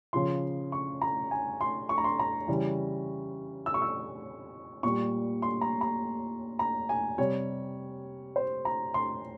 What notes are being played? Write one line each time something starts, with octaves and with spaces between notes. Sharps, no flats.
C#3 F3 C6
C#6
A#5
G#5
C6
C#6
A#5
C6
A#5
C#3 E3 G3
E6
C#6
E6
A#2 G3 C#6
C6
A#5
A#5
A#5
G#5
C3 G3 C#5
C5
A#5
C6